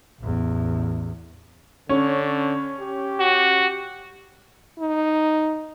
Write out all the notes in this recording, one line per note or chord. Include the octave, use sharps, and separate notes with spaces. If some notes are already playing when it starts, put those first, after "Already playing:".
A1 E2
D3 C#4
G4
F#4
D#4